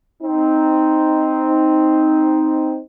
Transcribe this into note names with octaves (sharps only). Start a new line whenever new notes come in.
C4 D#4